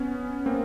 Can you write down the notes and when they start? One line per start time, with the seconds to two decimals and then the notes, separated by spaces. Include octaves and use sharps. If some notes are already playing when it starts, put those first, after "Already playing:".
Already playing: B3 C#4
0.46 A#3 C4